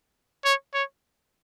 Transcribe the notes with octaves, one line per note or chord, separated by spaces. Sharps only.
C#5
C#5